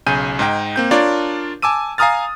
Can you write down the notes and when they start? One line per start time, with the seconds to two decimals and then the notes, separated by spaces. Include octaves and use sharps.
0.07 B1 C#3 G#5 G6 D#7
0.39 G#2 D#4 G5
0.76 A#3 C4 G6
0.91 D4 F4 A#4 C#5 D5
1.62 G#5 A5 D6 E6 D#7
1.98 F5 G#5 A#5 D#6 F6 A6